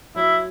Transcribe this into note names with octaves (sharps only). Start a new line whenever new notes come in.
F#3 E4